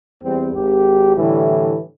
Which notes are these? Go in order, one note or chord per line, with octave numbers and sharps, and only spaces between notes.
E2 G3 C4
G#1 G4
A2 D3 E3 G3